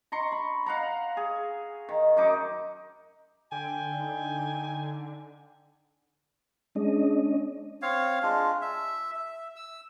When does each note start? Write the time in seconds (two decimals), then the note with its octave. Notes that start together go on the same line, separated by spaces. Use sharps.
0.12 A#5 C6 C#6
0.32 B5
0.66 F5 F#5 A#5
1.17 G#4
1.89 D#3
2.17 F#2 D#4 D6
3.52 D3 G5 G#5
3.94 D#4
6.76 G#3 C#4 D4 D#5
7.82 C4 C#5 F5
8.23 G#3 D4 F4
8.62 E5
9.15 E5
9.56 E6